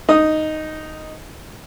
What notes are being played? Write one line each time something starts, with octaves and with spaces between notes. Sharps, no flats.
D#4 D#6